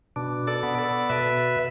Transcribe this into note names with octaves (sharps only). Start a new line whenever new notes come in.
B2 D4
A4 D5
B3
A4 D5
B2 B4 E5